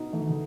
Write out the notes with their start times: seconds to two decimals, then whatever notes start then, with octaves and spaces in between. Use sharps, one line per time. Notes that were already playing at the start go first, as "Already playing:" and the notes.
Already playing: B2 D#4
0.13 E3 A3
0.22 D#3
0.30 C#3